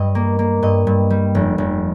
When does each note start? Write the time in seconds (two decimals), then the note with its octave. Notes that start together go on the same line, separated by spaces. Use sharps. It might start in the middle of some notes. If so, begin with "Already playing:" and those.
Already playing: G2 D#5
0.15 A#3
0.39 A#3
0.62 G2 D#5
0.87 G2
1.10 G3
1.35 F1
1.58 F1